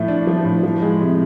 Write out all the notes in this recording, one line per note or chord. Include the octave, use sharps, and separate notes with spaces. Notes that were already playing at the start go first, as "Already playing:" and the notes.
Already playing: A2 F3 A3
D4
F3
A2
F3
G#3
C3